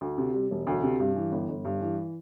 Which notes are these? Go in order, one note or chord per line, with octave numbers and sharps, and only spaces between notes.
D2
C3
G3
E1
D2
C3
G2
E3
G1
G1
G2
E3